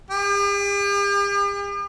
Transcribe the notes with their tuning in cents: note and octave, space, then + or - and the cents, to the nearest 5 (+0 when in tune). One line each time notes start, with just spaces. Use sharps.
G4 +45